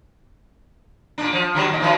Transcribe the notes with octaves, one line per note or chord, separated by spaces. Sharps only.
A#2 D4
F3
D3 F#3 G3
D#2 A#2 D#5
D#3 E3 F#3